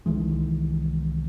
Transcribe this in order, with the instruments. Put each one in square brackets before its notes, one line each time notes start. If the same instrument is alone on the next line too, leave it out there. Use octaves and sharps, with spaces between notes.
[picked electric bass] C2 D#3 E3 G#3